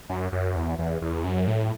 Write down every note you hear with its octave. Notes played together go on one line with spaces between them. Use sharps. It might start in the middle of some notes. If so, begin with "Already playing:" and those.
F#2
F#2
E2
E2
E2
F#2
A2